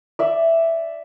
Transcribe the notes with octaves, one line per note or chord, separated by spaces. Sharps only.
D5 E5